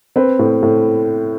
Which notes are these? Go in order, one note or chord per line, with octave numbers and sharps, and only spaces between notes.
C4 B4
A2
A2